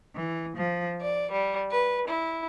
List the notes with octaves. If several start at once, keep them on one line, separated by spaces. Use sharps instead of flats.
E3
F3
D5
G3
B4
E4